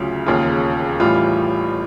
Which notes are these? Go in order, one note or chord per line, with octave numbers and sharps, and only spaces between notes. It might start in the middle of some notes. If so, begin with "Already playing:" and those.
Already playing: D2 C#3 F#3 F4
E1 D#2 C#3 F4
A1 A2 E3 G3 F4